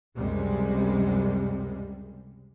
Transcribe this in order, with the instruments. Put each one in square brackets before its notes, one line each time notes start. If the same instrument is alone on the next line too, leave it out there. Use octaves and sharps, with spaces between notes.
[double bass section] C#2 F#2 C3 G3 G#3